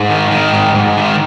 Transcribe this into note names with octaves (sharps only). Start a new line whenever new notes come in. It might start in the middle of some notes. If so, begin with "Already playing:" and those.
Already playing: G#2 G#3
D#3
D#3
G#2
G#2
D#3